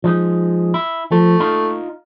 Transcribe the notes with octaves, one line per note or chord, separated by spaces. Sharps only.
F3 G#3 D#4
E4
F3 A3
D#4 F4